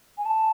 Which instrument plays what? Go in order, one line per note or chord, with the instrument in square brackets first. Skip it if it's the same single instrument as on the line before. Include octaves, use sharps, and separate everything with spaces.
[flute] G#5
A5